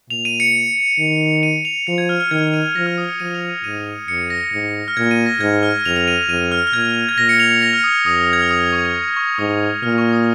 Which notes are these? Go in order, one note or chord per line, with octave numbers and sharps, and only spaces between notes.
A#2 F7
D#7
C#7
D#3
D#7
F7
F3 C#7
G#6
F6
F6
D#3 G#6
D#7
F3 A#6
F6
D#6
C#7
F3 D#7
F7
D#7
G#2 D#7
F2 C#7
A#6
G#2
F6
A#2 G#6
D#7
A#6
G#2 G#6
F6
F2 F7
F7
D#7
F2 D#7
F6
F6
A#2 G#6
G#6
A#2 A#6
C#7
F7
C#7
A#6
F6
D#6
F2 D#6
G#6
F6
D#6
C#6
C#6
C#6
G#2 D#6
A#2 F6
C#6
D#6